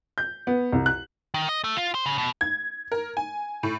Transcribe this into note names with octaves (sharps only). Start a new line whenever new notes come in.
G6
B3
C2
F#6
D#3
D#5
A3
F4
C5
C#3
B2
G#6
A#4
G#5
A2